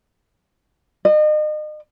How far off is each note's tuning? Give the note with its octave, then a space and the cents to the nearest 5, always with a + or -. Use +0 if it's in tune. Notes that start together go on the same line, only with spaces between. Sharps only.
D#5 -35